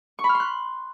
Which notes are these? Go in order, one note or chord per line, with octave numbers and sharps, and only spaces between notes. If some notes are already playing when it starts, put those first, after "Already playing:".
C#6
B5
F6
C6
F#6